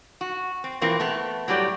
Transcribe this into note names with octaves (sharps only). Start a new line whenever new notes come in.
F#4
C4
B2 E3 A#3 C4 F4
A3 B3
A2 F#3 G3 G4 D5